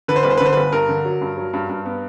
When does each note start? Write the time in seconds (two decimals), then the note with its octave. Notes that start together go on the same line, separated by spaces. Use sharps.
0.08 D3 B4
0.16 C5
0.23 G1 B4
0.30 C5
0.38 B4
0.40 D3 C5
0.53 G1 B4
0.72 G2 A#4
0.89 D3
1.05 F#3
1.21 G2
1.37 F#3
1.54 G2
1.69 G2
1.86 B3